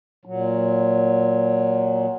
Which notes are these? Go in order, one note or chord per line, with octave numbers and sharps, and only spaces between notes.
A#2 F#3